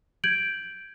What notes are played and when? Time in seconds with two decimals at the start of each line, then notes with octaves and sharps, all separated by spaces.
0.24 G6 G#6 D7 F#7